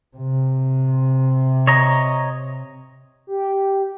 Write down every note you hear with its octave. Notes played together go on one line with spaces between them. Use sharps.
C3
C#5 D#5 A#5
G4